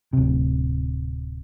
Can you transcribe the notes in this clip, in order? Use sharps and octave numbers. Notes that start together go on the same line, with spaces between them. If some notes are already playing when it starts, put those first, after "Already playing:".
D1 C3